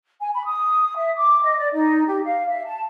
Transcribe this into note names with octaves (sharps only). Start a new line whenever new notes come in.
G#5
B5
D#6
E5
D6
D#5
D5
D#4
G4
F5
E5
A5